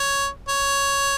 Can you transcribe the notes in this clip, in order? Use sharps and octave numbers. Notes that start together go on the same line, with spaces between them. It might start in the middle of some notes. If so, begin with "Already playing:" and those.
Already playing: C#5
C#5